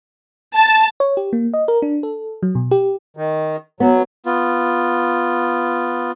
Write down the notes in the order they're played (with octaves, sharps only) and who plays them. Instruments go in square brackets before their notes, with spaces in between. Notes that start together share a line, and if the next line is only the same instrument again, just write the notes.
[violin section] A5
[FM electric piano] C#5
G4
A#3
D#5
A#4
D4
A4
F#3
B2
G4
[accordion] D#3
[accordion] F#3 [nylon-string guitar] B3
[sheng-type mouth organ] B3 F4